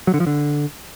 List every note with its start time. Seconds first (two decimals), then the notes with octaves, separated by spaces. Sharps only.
0.07 F#3
0.14 D3
0.20 F3
0.27 D3